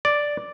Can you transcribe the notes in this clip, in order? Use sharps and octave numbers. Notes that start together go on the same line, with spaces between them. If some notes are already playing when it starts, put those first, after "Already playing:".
D5